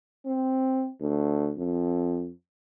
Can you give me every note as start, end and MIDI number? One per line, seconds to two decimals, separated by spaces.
0.26 0.89 60
1.01 1.53 38
1.58 2.31 41